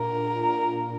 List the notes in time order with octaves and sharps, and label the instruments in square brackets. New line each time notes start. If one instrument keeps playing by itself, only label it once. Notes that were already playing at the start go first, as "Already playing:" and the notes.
Already playing: [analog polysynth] A#2 D4 F4 [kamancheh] A#4